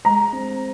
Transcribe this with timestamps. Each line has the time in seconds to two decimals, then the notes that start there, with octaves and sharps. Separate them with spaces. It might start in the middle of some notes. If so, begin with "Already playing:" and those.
0.05 G#3 A#5
0.33 C4